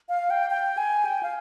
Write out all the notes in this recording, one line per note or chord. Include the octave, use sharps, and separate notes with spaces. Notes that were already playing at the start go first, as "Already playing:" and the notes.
F5
G5
G5
G#5
G5
F5